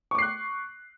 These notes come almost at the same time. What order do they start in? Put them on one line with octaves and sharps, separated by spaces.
C#6 D6 C7 F#6